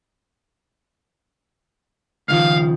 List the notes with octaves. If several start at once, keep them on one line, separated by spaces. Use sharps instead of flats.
C#2 D#3 F3 F5